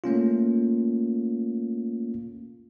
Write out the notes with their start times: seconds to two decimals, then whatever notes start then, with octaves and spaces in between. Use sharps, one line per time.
0.04 A3 A#3 C#4 F4